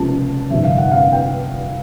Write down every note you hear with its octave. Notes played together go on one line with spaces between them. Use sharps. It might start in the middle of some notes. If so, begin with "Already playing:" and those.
Already playing: C#2 C3 F3 A#3 C#4 A5
G1 F2 C3 D#3 G3 E5
F5
F#5
F5
G5